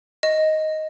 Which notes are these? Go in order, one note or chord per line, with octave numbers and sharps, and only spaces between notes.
D#5